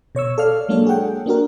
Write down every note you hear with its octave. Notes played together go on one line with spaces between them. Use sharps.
B2 C#5 C#6 E6
A4 D5 F5 F6
F#3 G#3 A#3 D4 A4 C#5
G#4 A4 F#5 G5
A#3 D4 F#4 A#4